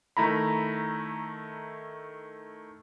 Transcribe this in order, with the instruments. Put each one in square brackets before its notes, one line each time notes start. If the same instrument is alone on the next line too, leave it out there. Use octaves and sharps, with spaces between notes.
[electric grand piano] D#3 A3 E4 A#5 B5